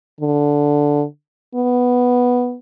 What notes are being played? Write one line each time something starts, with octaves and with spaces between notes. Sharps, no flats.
D3
B3